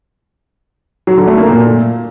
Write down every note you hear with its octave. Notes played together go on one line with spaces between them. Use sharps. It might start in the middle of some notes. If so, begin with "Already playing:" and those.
F#3
D3
A3
A#3
A#2